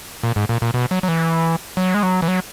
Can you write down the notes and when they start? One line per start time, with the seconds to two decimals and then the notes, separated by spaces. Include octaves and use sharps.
0.23 A#2
0.36 G#2
0.49 A#2
0.62 A#2
0.74 B2
0.91 F#3
1.03 F#3
1.08 E3
1.77 F#3
1.94 G#3
2.03 F#3
2.22 E3
2.28 F#3